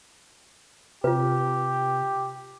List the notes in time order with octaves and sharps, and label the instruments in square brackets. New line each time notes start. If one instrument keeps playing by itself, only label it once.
[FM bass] C3 [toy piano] F4 B4 [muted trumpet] G4